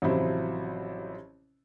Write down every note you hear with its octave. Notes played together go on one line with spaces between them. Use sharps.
A1 C3 F3 F#3 E4 C5